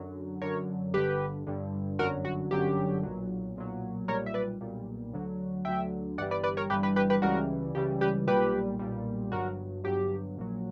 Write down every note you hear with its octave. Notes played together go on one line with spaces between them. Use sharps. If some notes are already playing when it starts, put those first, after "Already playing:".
Already playing: F#2 D3 F#3
F#2 D3 F#3 A#4 C#5
G1 G2 D3 G4 B4
G1 G2 D3
G1 F#2 D3 F#3 F#4 A#4
F#4
G1 F#2 D3 F#3 G4
B1 A#2 F#3
B1 A#2 F#3
B1 A#2 G3 A#4 C#5
E5
B4 D5
B1 A#2 G3
D2 D3 F#3
D2 D3 F#3 E5 G5
G1 G2 E3 G3 D5 F#5
B4 D5
B4 D5
A#4 C#5
G1 G2 E3 G3 G4 B4
G4 B4
G4 B4
G4 B4
C#2 C#3 E3 G3 F#4 A#4
C#2 C#3 E3 G3 G4
G4 B4
B1 A#2 G3 G4 B4
B1 A#2 G3
G1 G2 F#3 F#4 A#4
G1 G2 F#3 G4
A#1 A#2 F#3